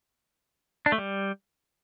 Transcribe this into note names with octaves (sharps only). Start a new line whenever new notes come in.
D4
A3
G3